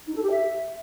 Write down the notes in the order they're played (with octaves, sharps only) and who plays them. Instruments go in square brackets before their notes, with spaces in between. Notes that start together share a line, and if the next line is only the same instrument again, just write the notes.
[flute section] D#4
A4
G4
E5